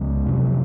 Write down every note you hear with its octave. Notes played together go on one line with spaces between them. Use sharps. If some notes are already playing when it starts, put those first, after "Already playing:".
Already playing: C#2 C#3 F3 G#3
F2 C3 F#3